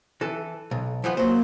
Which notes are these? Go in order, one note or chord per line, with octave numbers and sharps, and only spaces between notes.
E3 A4
B1
E3 F3 B3
F#3 A#3 C5